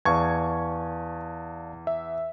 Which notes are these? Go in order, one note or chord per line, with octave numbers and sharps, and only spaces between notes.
E2 D5 F5 A5 C#6 G#6
E5